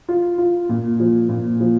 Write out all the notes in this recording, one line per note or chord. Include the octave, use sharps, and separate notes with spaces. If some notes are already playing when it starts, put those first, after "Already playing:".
F4
F4
A#2
F3
A#2
F3